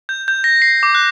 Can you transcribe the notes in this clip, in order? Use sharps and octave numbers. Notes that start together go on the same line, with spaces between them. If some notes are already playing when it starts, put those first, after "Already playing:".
G6
G6
A#6
C7
D6
F#6